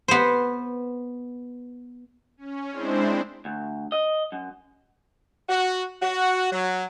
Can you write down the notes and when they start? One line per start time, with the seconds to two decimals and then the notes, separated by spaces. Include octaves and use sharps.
0.08 B3 C5
2.37 C#4
2.71 G#3 C4 D4 E4 C5
3.45 D2
3.92 D#5
4.32 F#2
5.49 F#4
6.02 F#4
6.52 F#3